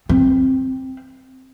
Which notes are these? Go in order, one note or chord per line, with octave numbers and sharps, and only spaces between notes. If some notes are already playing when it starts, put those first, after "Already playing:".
C4